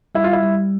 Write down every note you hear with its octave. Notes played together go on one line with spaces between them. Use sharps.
G3 E4
F4
E4
G3